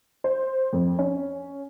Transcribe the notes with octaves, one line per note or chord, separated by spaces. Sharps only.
C5
F2
C#4